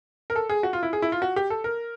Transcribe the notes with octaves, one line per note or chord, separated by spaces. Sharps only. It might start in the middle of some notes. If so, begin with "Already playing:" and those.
A#4
A4
G#4
F#4
F4
E4
G#4
E4
F4
F#4
G4
A4
A#4